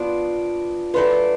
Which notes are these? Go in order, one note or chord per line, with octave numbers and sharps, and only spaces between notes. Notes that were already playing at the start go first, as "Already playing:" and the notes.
Already playing: F3 B3 D4 F4
F#3 A3 D4 F4 B4